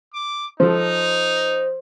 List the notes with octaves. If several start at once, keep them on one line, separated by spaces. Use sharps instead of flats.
D6
F3 D#4 A4 C5